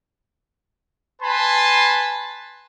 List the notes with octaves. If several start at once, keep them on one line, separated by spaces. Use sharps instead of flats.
B4 G#5 A5 B5 C6